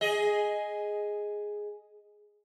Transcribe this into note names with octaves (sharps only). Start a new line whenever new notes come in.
G#4 D#5